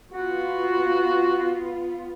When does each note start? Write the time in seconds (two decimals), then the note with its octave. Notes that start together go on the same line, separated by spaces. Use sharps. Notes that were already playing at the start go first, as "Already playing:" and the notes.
0.12 B3 F4 F#4